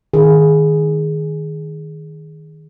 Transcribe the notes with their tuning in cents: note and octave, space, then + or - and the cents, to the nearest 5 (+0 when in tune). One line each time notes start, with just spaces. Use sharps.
D#3 +0 G#4 +0